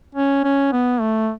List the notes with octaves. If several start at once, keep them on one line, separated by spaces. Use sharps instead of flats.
C#4
C#4
B3
A3